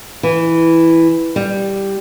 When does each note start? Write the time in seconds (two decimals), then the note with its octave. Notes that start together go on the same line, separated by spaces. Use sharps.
0.23 E3
1.36 G3